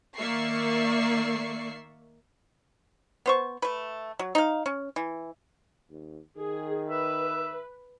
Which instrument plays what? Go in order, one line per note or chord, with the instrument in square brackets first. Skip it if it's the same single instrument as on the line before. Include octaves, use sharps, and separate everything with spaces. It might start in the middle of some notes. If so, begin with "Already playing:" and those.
[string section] D#3 A#3 D5 E5 C#6 C7
[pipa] B3 C5 C#6
A3 B4
F#3
D#4 F5
C#4
E3
[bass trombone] D#2
[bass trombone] D#3 [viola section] G#4
[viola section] B4 [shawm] E5